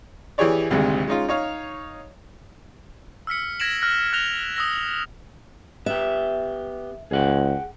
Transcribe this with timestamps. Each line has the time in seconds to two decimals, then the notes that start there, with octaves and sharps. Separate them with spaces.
0.38 E3 E4 G4 G#4 C#5 D5
0.70 G#1 D2 C3 G3 G#3
1.07 G#3 C#4 D#4 F4
1.29 D#4 C#5 F5
3.27 E6 F6 B6 C#7
3.60 G#6 A#6 B6 D7 E7 F#7
3.81 F6 F#6 A#6
4.13 F#6 G#6 A#6 F7 G7
4.56 D#6 E6 A#6
5.86 B3 G4 E5
7.11 C#2 G#4 F#5 G5